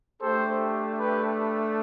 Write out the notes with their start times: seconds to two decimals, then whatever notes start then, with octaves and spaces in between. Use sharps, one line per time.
0.21 A3 D4 G4 A4 C5
0.98 G4 B4